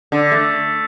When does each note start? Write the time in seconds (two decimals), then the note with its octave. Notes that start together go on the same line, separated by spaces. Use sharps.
0.12 D3
0.32 A3